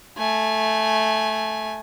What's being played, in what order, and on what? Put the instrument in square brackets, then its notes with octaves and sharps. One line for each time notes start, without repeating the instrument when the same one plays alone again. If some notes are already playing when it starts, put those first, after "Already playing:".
[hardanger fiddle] A3 G#5